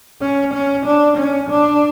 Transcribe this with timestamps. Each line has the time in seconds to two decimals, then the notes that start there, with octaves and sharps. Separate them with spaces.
0.22 C#4
0.53 C#4
0.86 D4
1.17 C#4
1.50 D4